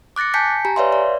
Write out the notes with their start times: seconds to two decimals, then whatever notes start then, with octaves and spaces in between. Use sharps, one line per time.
0.16 D6 F#6 A6 A#6 C#7
0.34 G#5 A5 G6 B6 C#7
0.65 G4 G#5 A#5
0.76 B4 C#5 D5 E5 F5 C6
0.92 D5